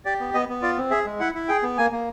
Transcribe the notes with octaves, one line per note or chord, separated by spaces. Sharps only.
G4 D5
B3
B3 D#5
B3
F4 D5
C4
G#4 E5
G#3
E4 F#5
E4
G#4 G5
B3
A#3 G#5
A#3